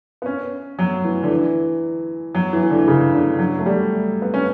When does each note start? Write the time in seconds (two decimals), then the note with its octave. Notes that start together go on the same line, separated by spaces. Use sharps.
0.22 B3
0.26 C#4
0.79 F#3
1.05 E3
1.23 D3
1.31 E3
2.35 F#3
2.53 E3
2.63 E3
2.70 D3
2.88 C#3
3.13 D3
3.39 F#3
3.59 A3
3.66 G3
4.22 B3
4.34 C#4